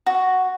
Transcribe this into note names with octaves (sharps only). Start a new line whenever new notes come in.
F#4